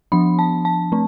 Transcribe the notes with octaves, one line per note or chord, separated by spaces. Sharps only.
F3 B3 D4 B5
A5
A5
A3 C4